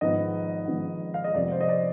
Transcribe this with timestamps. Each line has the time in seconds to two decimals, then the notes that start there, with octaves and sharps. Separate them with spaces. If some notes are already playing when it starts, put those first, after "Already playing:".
0.01 G#1 G#2 F3 B3 D#5
0.68 G#1 G#2 F3 B3
1.14 F5
1.24 D#5
1.34 F2 C3 F3 B3 D5
1.51 C5
1.61 D#5
1.69 D5